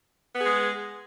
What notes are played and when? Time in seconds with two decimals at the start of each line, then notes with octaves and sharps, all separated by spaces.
0.35 B3
0.40 G#4
0.44 G#3